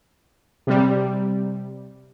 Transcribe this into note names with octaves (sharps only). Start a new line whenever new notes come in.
C3 G3